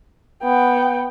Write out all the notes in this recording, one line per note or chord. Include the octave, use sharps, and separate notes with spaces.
B3 G5